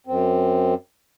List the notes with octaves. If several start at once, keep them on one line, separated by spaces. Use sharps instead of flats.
F#2 C4